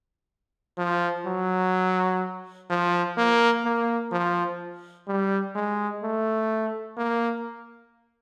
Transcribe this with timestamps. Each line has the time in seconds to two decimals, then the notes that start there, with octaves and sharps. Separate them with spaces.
0.78 F3
1.26 F#3
2.70 F3
3.17 A#3
3.65 A#3
4.12 F3
5.07 G3
5.55 G#3
6.03 A3
6.97 A#3